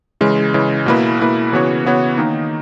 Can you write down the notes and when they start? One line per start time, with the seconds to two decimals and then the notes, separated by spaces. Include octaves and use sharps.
0.21 C#3 E3 G#3
0.54 C#3 E3 G#3
0.86 B2 A#3 E4 B4
1.19 B2 A#3 E4 B4
1.52 C#3 E3 B3 F#4 C#5
1.85 C#3 E3 B3 F#4 C#5
2.18 D#3 A#3 D#4